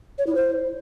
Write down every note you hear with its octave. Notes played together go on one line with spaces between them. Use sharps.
C#5
E4
C5